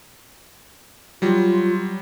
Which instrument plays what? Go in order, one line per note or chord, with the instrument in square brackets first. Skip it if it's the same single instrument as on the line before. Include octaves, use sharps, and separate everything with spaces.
[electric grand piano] F#3 G3 [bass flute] F4